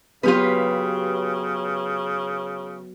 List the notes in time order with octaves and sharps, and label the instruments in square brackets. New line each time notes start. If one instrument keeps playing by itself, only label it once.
[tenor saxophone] C#3 [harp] F#3 B3 [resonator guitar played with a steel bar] F4 G4 B4